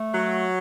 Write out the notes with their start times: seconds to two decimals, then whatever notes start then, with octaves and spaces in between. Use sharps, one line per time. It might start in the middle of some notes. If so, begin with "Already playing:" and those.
Already playing: A3
0.14 F#3